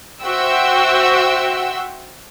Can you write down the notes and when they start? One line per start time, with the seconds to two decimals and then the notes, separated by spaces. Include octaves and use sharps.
0.23 F#4 C5 E5 F#5 G5 E6